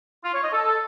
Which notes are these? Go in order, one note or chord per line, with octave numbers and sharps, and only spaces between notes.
F4
C#5
D#5
A4